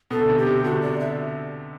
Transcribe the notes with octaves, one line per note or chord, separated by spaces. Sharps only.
B2 A4
D3
C3
G4
C3
D3 F#4
D5
E5